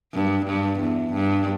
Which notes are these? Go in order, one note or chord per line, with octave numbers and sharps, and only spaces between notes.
G2
G2
E2
G2